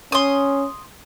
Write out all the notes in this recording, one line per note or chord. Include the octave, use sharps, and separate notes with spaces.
C#4 C6 D#6